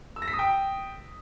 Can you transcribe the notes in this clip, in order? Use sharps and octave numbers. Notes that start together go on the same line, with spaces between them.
E6
A#6
B6
D#6
G5